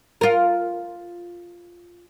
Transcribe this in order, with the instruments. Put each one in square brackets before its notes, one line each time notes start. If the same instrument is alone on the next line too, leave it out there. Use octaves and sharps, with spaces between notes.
[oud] F4 A#4